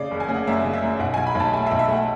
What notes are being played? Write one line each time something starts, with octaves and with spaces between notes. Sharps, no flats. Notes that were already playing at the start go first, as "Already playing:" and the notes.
Already playing: C#3 D5
F#1
G#5
C#3
F#5
F#2 E5
C#3
E5
F#2
B1 F#5
B1 G#5
B5
B1 A5
A3 G#5
E5
B1
E5
A3 F#5